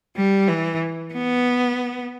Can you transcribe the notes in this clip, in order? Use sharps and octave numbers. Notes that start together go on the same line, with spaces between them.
G3
E3
B3